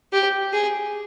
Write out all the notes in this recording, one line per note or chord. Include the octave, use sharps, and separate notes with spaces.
G4
G#4